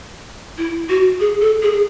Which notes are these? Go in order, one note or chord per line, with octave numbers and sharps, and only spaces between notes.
E4
F#4
G#4
A4
G#4